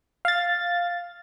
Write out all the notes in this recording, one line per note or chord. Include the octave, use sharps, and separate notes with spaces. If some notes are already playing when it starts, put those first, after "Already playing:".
F5 A6